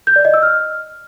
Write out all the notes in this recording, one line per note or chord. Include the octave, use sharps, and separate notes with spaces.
G6
D5
D#5
E6
F6